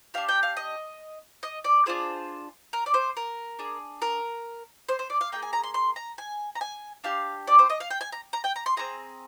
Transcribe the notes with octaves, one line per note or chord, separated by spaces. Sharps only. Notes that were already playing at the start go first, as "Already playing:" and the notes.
D4 G4 F5
G5
F5
D#5
D#5
D5
D4 F4 G#4 C5
A#4
D5
C5
A#4
D4 G#4
A#4
C5
C5
D5
F5
A#3 F4 G#4 G5
G#5
A#5
C6
C6
A#5
G#5
A#5
G#5
D4 G4 F5
D5
C5
D#5
F5
G5
G#5
A#5
A#5
G5
A#5
C6
C4 F4 G#4 A#5